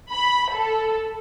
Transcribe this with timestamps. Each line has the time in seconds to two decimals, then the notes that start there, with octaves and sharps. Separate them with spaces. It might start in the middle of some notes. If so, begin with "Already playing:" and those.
0.10 B5
0.53 A4